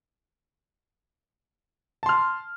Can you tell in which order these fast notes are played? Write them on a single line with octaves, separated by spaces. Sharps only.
A5 C6 F6